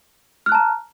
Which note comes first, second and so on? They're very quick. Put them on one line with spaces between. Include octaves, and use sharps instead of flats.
F6 F#6 A5 A#5